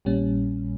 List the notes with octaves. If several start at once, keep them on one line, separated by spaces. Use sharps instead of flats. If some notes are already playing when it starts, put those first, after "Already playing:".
A#1 A#2 G3 C#4